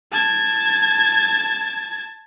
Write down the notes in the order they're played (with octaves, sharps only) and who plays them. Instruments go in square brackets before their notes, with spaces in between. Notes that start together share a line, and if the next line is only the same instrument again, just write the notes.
[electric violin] A5 G#6